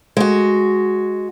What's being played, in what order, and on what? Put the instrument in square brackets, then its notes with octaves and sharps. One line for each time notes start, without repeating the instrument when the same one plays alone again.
[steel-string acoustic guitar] G#3 F#4